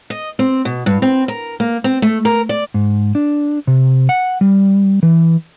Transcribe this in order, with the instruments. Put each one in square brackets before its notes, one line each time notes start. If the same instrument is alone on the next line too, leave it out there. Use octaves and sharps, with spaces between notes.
[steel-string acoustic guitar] D#5
C4
B2
G2
C4
A#4
A#3
C4
A3
A#4
D5
[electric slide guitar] G#2
D4
C3
F#5
G3
E3